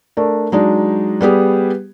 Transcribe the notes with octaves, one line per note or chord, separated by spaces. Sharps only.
A3 D4 A#4
F#3 G#3 D4 D#4
G3 B3 G4 G#4